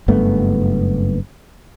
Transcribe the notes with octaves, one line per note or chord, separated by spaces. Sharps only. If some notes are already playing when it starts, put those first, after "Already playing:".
F#1 G2 A3 B3